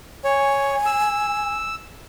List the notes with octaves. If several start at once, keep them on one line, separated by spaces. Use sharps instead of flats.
C#5 G#5
E6